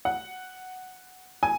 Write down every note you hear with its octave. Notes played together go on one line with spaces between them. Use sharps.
F#5
G#5